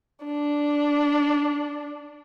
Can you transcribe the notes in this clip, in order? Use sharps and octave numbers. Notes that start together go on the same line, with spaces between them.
D4